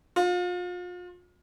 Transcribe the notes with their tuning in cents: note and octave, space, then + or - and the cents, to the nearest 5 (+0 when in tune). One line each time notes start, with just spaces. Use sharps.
F4 +35